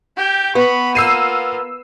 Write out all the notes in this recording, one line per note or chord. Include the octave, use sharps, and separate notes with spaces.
G4 G5
B3 B5 C#6
A#3 F4 E6 C7 D#7